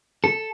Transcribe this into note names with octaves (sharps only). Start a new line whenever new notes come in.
A4